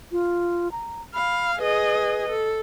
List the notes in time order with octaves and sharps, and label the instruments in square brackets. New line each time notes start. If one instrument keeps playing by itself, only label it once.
[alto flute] F4
A#5
[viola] F5 [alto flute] B5
[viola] G#4 D#5 [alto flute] B4
[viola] A4